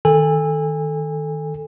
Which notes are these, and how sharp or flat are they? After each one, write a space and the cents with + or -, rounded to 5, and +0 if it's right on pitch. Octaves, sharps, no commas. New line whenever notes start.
D#3 +0 A4 -5 G#5 -30